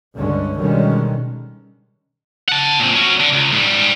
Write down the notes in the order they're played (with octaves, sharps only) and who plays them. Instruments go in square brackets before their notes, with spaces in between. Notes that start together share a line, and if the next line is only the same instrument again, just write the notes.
[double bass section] C#2 G2 D3 G#3 C#4
B2 D3 D#3 G3 G#3 C#4
[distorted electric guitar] F#5 A5
A#2 C4
C#4 F#4
D3
C#2
G#2 G3